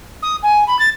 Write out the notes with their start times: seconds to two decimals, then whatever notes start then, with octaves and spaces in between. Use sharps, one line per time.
0.23 D#6
0.43 G#5
0.67 B5
0.79 A6